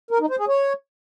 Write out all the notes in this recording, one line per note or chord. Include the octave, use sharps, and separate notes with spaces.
A#4
D#4
C5
G#4
C#5